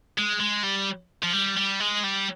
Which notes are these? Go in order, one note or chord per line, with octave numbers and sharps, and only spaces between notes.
G#3
G#3
G3
F3
G3
G3
G#3
G3